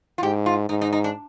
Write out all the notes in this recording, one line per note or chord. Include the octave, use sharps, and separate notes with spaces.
F4
G#2 G4
F4
G#2 D#4
D#4
D#4
D4